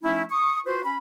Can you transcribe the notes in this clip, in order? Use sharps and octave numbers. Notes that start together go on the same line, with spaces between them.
F3 A3 C#4 D#4 E4
C#6 D#6
F4 F#4 B4 C5
C#4 B5